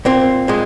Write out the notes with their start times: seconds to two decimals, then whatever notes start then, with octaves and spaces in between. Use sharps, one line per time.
0.05 A#2 A#3 C4
0.48 A#2 G#3